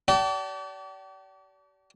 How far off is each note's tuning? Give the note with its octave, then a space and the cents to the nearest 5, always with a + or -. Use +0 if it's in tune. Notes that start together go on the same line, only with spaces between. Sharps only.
G4 -45 D5 -35 A5 +0